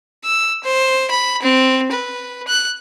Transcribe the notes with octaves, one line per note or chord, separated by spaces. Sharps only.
E6
C5
B5
C4
B4
F#6